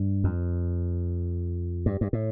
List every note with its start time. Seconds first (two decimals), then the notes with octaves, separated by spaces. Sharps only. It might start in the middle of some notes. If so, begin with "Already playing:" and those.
Already playing: G2
0.24 F2
1.86 G2
2.01 G2
2.13 A2